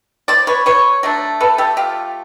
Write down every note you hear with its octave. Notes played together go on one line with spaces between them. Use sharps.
C5 D5
B4 C#5
B4 C#5
F#3 A3 D4
A4 B4
G4 A4
F4 G4